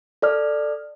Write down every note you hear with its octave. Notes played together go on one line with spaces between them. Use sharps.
A4 D5 F6